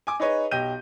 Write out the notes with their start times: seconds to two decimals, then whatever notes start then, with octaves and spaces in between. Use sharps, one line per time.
0.07 G#5 D6
0.20 D#4 G#4 B4 C#5 D#5
0.51 B1 G4 D#5 G6 D#7